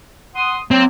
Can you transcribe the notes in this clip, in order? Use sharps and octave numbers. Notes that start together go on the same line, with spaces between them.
F#5 C6 D#6
F#3 A#3 C4